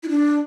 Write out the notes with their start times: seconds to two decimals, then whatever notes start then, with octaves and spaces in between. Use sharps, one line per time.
0.03 E4
0.09 D4